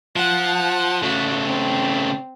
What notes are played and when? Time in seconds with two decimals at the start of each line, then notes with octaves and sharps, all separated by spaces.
0.16 F3 F#5
1.03 C#3 A3 F#4
1.45 C4